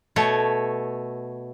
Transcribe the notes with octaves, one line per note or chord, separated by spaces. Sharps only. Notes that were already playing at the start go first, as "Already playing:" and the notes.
B2 A3 C#5